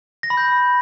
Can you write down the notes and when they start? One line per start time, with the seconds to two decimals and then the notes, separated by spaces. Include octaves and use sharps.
0.23 A#6
0.30 B5
0.37 G6